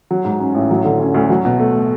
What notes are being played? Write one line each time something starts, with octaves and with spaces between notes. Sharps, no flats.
F#3
G#2
C#4
A1
F#3
D3
C#4
D2
F#3
B2
A3